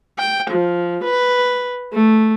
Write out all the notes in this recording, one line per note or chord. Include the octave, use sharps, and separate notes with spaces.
G5
F3
B4
A3